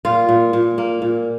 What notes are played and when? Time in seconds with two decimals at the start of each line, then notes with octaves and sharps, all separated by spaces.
0.05 A#2 F4
0.29 A#2
0.53 A#2
0.78 A#3
1.02 A#2